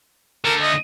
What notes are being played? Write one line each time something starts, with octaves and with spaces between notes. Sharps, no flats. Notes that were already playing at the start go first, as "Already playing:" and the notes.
D3 A3 A#4
D#5